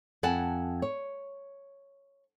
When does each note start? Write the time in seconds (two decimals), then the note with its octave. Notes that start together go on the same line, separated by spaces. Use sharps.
0.23 F2 F#5 G#5 A5
0.82 C#5